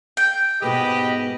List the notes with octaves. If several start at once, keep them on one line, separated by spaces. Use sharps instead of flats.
G5
G#2 B2 G#3 G4 B4 D#5